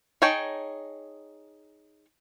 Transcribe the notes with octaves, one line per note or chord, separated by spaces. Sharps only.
D#4 G#4 C#5 G5 A5